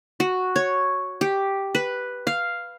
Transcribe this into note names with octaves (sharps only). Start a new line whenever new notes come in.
F#4
C#5
G4
B4
F5